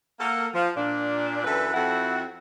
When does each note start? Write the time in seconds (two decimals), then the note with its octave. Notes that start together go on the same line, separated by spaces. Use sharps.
0.20 A#3 A4 F#5
0.54 F3
0.77 A#2 D4
1.45 F#2 E3 A4 B4
1.74 F2 C4 E4 F#4 A4 F#5